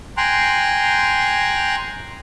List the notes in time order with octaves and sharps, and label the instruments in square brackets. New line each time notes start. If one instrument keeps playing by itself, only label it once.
[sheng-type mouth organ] G5 G#5 A#5 C6 F#6